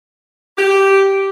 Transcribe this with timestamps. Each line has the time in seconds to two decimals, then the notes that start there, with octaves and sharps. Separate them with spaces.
0.58 G4